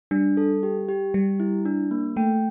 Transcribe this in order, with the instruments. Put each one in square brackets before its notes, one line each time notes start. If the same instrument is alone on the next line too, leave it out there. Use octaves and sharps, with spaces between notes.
[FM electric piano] G3 [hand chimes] D4
[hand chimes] A4
G4
G4
[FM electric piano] G3 [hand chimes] G4
[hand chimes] E4
D4
A#3
[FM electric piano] A3 [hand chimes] G5